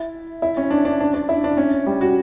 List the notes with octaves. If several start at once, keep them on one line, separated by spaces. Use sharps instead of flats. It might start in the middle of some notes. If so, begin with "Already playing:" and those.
Already playing: E4
E4
C#4
D4
D4
D4
D4
E4
D4
C#4
G3
F#4